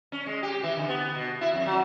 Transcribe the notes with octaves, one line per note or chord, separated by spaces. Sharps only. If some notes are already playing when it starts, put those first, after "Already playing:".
C#4
G#3
G4
E3
D3
B3
B2
E4
F2
F#3